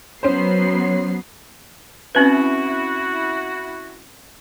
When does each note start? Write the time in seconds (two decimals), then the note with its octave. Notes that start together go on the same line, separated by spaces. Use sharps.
0.23 F#3 B3 C#4 C5 C7
2.15 C4 C#4 E4 F#4 B4